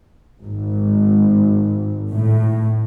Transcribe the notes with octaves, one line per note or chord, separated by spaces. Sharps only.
G#1
A2